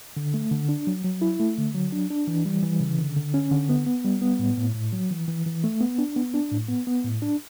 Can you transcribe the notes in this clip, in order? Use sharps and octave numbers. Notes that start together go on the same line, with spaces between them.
D3
A3
D3
D4
F#3
F#3
E4
A3
D3
F#3
D4
D4
E3
G3
E3
C#3
D3
D3
C#4
D3
B3
B3
G3
B3
A2
A2
A2
F#3
E3
E3
E3
A3
B3
D4
B3
D4
A2
B3
B3
A2
D4